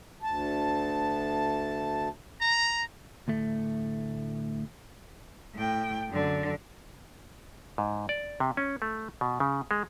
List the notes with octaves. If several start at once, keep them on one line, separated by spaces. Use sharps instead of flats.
D2 A5
A#5
D2 A2 A3
A2 G5
F#2 D3
G#2
D5
C3
C#4
A3
B2
C#3
G#3